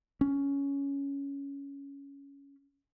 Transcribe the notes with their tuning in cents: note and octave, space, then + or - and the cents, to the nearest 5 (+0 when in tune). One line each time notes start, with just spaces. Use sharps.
C#4 +10